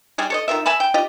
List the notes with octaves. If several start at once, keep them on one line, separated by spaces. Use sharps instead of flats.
G3 G#3 G#4
A4 C#5 D#5
D#3 F4 A#4 E5
E5 G#5 A5 B5
G5
F4 G4 D#5